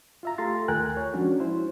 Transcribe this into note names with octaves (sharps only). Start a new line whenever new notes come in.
F4 E5 A#5
A3 F4 G4 A4 C6 A6
D#2 A3 A#4 G5 G#5 F#6
C#5
F3 G#3 C#4 D4 F#4
E4 C5